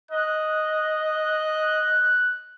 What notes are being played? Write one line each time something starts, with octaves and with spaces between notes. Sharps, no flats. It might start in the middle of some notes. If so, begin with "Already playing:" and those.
D#5 F#6